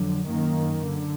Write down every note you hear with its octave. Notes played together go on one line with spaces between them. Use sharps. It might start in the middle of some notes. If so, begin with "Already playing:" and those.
Already playing: F2 D3 F#3
F#2 D#3 A#3
D3